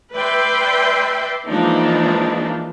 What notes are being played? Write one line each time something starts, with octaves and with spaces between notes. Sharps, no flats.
B4 D5 E5 G5 C6
E3 F3 G#3 A#3 D4 D#4